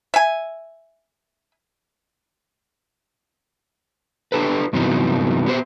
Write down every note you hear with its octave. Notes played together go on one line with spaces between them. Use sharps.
E5 G#5
D4 G4 A4 B4
G2 C3 E3 F#3 B3 D#4
B3 G4 C5